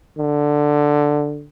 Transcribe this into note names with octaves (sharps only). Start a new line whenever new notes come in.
D3